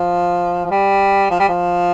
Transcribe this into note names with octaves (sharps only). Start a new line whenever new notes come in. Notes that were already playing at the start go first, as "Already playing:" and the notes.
Already playing: F3
F3
G3
F3
G3
F3